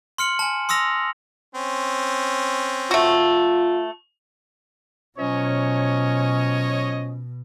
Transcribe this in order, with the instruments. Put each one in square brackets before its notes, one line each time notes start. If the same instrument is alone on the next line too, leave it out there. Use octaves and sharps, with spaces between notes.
[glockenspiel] C6 F6 C#7 F#7
G#5 A5
C6 D#6 E6 A#6 F7
[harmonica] C4 C#4
[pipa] A3 F#4 [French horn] F4
[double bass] B2 [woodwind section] F3 F#3 C#4 [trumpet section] C#5 D#5